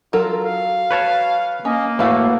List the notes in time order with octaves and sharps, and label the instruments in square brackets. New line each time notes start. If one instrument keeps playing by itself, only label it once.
[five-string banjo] F#3 A4 A#4 [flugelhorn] F4
[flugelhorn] F5
[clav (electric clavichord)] B4 C#5 A5
[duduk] A#3 [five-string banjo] C#4 [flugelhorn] D#5
[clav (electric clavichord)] A2 A3 [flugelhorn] F#4 [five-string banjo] B4 F5